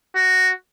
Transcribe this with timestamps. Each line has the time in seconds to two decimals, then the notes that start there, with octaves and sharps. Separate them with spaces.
0.16 F#4